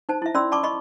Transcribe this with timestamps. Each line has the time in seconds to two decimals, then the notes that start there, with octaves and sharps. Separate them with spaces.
0.09 D#4 C5 A5
0.22 E4 E5
0.34 C#4 D5 B5 C6 E6
0.52 D5 A5 B5 C#6 D6
0.63 D#5 B5 C#6